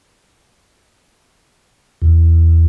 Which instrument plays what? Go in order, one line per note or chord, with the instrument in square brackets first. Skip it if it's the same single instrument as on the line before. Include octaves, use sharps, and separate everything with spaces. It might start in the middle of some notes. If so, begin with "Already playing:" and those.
[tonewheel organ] E2